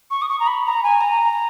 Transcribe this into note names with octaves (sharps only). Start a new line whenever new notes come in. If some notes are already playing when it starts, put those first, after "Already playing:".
C#6
D#6
C#6
A#5
B5
A#5
G#5
A#5